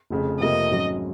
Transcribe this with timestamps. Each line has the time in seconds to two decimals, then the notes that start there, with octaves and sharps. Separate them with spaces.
0.10 F1 F2 C#3
0.40 F2 C3 F3 A#3 F4 D#5
0.70 G#1 G#2 F#3 C#4